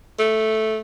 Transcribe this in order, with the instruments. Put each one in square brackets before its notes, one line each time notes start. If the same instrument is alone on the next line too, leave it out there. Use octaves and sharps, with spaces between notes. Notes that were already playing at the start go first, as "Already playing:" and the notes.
[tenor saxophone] A3